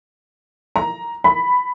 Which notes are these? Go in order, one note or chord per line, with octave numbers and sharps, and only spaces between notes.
A#5
B5